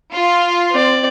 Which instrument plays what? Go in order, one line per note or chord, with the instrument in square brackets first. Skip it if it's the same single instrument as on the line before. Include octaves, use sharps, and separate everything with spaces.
[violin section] F4
[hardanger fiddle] C4 D5